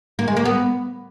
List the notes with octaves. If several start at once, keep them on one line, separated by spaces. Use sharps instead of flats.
A#3
G#3
A#3
B3